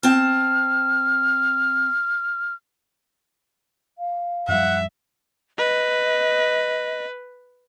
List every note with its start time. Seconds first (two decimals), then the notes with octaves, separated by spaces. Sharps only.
0.03 C4 A5 F6
3.98 F5
4.48 F#2 F3 G3 E5 F#5
5.58 B4 D#5